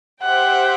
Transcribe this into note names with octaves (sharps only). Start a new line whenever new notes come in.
G4 C5 E5 F#5 G5